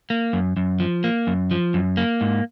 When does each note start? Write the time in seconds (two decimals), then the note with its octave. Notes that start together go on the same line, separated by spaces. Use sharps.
0.10 A#3
0.33 F#2
0.57 F#2
0.80 F3
1.04 A#3
1.27 F#2
1.51 F3
1.74 F#2
1.97 A#3
2.21 G#2